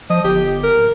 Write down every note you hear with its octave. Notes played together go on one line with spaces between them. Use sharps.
F3 D#5
G1 G4
A#4
D1